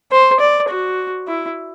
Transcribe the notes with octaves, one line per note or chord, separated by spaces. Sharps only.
C5
D5
F#4
E4